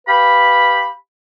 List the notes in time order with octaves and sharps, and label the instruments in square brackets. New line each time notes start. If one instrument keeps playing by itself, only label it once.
[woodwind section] G4 B4 F5 B5